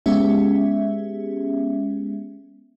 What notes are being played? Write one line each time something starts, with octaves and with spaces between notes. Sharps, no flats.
G#3 B3 C#4 G4 G#4 E5